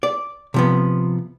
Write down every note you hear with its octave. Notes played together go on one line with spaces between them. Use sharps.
D5
C3 F3 B3